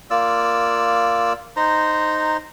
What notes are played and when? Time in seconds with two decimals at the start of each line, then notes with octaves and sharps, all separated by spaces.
0.11 A#3 F4 D5 E6
1.57 D#4 C5 A#5